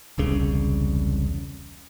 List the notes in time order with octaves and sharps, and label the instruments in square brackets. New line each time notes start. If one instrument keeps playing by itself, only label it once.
[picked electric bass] E1 C2 C#3